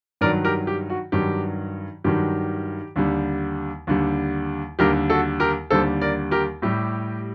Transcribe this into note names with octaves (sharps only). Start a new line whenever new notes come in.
G2 D#3 F#3 A#4 D5
G4 A#4
G4
F#4
G2 D#3 F#3 G4
G2 D#3 F#3 G4
D#2 D3 G3
D#2 D3 G3
D#2 D3 G3 G4 A#4
F#4 A4
G4 A#4
D#2 D3 G3 A4 C5
A#4 D5
G4 A#4
A2 G3 G4